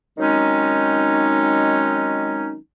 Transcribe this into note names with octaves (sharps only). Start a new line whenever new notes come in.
D#3 F#3 G#3 C4 C#4 D#4